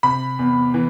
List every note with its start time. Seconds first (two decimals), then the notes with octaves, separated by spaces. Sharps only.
0.03 C3 B5
0.39 E2
0.74 E3